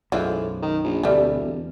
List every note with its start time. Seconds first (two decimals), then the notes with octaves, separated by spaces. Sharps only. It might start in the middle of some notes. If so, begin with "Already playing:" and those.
0.12 B1 F#2 A2 E3 F3 G#3
0.62 D#3
0.83 A#1
1.03 D1 D2 B2 G3 A3
1.41 E2